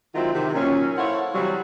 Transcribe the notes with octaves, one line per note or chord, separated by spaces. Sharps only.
D#3 F#3 G#3 C4 E4 F4
C3 D#3
A#2 D#3 F#3 C#4
E4 A4 C5 C#5 F5 F#5
C3 E3 F#3 G3